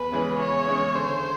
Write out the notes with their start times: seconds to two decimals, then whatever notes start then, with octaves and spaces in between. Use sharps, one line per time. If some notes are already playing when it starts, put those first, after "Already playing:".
Already playing: E2 B4
0.12 C#3 E3 G#3 C#4
0.39 E2 C#5
0.67 C#3 E3 G#3 C#4
0.95 D3 C5